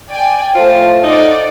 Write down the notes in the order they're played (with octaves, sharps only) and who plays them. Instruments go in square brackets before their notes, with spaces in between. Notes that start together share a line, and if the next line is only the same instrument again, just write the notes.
[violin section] D5 G5 G#5
[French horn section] A2 A3 C5 [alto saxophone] F4 [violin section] A5
[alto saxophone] D#4 [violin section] D5 F#5